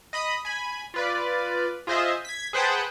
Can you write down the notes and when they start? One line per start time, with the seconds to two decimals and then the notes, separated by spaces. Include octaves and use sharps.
0.13 D#5 B5 D#6
0.45 G#5 B5
0.94 F4 B4 D5
1.87 F4 G#4 C5 D#5 E5
2.25 G#6 B6
2.53 G#4 B4 C5 F#5 G5 A5